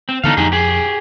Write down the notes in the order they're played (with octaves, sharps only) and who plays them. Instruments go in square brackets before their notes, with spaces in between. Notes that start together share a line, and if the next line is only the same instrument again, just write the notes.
[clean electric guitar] C4
[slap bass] D3 E3 B3 [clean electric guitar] D#4 A4 F5
[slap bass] F2 [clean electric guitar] D#4 G4 G#4
[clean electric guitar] G4 G#4